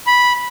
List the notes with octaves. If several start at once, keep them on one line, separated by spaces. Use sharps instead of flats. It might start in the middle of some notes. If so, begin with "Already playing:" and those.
B5